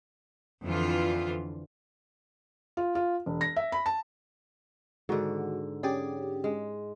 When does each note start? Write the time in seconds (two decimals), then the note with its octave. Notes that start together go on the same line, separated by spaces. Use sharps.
0.63 F2 D3 E3 F4
2.77 F4
2.95 F4
3.26 E1
3.41 A#6
3.56 E5
3.72 B5
3.86 A5
5.09 G#2 D3 D#3 F#4
5.83 C#4 G4 G#4 D5
6.44 G#3